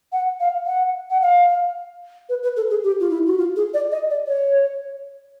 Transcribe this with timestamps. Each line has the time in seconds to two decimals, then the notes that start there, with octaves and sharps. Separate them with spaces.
0.12 F#5
0.40 F5
0.66 F#5
1.10 F#5
1.21 F5
2.29 B4
2.43 B4
2.56 A4
2.70 G#4
2.83 G4
3.00 F4
3.10 E4
3.26 F#4
3.38 F4
3.56 G#4
3.73 D5
3.91 D#5
4.10 D5
4.27 C#5